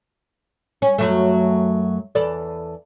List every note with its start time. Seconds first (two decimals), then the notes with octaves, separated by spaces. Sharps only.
0.82 C#4
0.98 F#2 F#3 A3
2.15 E2 A4 D5